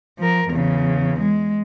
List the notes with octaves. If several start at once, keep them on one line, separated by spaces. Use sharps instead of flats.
F3 A#4
E2 C#3
G#3